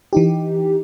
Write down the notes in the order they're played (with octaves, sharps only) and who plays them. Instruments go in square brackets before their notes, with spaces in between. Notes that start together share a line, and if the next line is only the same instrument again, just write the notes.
[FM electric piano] E3 D#4 G4